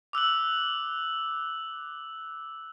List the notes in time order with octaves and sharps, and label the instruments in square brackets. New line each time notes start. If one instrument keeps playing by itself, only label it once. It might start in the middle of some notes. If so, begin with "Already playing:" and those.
[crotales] D6 E6 F#6 F#7